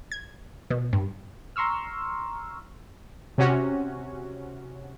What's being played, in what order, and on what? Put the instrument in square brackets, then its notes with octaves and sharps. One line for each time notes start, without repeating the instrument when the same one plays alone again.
[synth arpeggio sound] G#6
B2
G2
[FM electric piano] A#5 C6 C#6 E6 F6
[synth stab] C3 C#4 F#4